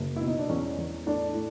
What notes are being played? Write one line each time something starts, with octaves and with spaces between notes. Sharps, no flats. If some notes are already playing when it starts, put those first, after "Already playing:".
Already playing: F#1
B2 E4
D#4
D4
E2 C#4
E2
A2 D4
A2